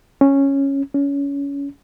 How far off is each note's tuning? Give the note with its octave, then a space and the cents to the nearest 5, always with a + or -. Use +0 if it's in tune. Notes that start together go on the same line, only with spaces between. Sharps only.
C#4 -5
C#4 +25